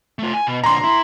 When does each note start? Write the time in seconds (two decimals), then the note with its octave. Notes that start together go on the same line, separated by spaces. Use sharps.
0.19 A3 F4
0.34 G#5
0.47 B2
0.64 A#2 D3 A#5 C6
0.84 E4